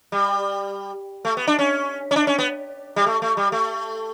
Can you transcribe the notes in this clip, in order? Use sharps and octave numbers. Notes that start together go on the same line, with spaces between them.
G3
A3
B3
D4
C#4
C#4
D4
C#4
B3
G3
A3
A3
G3
A3